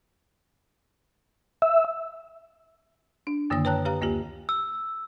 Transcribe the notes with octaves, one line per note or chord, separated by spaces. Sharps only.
E5
D4
F#2 D3 D#3 A#3 D#6
B4 C#5 G5 A5 A#5 F#6
G4 B4 F5 A#5
D2 A#3 F4 G4
E6